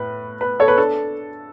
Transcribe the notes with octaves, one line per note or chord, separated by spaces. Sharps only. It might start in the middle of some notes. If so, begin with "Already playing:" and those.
Already playing: A2 B4
B4
A4 C#5
B4
D4 A4